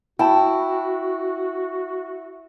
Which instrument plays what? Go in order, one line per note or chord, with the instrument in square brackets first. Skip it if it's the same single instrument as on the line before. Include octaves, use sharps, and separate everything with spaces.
[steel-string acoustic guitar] E4 [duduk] F#4 [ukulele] G5 A5